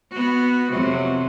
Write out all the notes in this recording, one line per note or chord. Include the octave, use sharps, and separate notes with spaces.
B3 F#4
F2 C3 F#3